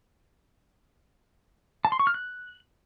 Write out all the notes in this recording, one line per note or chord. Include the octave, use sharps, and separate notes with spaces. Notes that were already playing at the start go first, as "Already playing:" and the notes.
A5
C6
C#6
F6
F#6